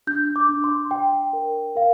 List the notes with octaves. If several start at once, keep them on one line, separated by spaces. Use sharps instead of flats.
D4 G6
D6
D4
C6
D4 G5
A#4
A#4 F5